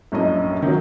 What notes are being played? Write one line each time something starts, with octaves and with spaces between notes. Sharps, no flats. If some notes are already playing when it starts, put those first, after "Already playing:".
A#1 F#2 A2 D4 D#5
D#3 F#3